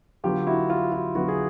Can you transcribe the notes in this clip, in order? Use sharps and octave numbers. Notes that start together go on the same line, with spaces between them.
D3 F#3 B3 F4 G4
E4 F#4
F4
F4
D3 F#3 B3 E4 F#4
G#4